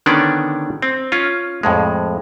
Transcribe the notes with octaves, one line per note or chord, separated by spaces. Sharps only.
D3 D#3 B3 C#4 D4 D5
C4
C#4 F4
F2 A2 G#3